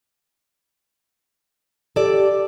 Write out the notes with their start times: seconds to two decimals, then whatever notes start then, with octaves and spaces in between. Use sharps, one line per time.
1.96 G4 A4 D5